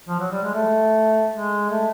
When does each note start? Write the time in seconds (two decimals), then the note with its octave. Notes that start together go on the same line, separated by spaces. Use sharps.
0.08 F3
0.20 F#3
0.31 G3
0.43 G#3
0.54 A3
1.32 G#3
1.70 A3